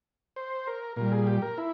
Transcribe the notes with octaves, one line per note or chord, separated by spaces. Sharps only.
C5
A#4
A#2 G3 A#4
G#4
G4
A#4
E4